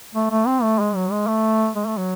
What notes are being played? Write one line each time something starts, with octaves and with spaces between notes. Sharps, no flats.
A3
A3
C4
A3
G#3
F#3
G#3
A3
G#3
A3
F#3